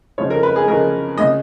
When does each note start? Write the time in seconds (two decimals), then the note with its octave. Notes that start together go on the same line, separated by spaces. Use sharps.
0.18 C#3 F3 G#3 C#5
0.30 A#4
0.43 B4
0.56 G#4
0.67 C#3 F3 G#3 A#4
1.18 C#3 G#3 D#5